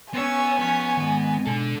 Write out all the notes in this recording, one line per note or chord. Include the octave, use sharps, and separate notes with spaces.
B3 C#4 C#5 G#5 E6
F3 C#4 C#5
G#2 D#3
B2 D3 A4